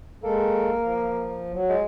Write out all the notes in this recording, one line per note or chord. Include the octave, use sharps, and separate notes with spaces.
G#3 A#3 A4
F3
F#3
G#3